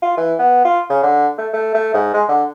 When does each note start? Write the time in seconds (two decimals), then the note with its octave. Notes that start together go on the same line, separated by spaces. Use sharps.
0.02 F4
0.17 E3
0.39 B3
0.65 F4
0.90 C#3
1.03 D3
1.38 A3
1.54 A3
1.75 A3
1.94 G#2
2.14 G#3
2.29 D3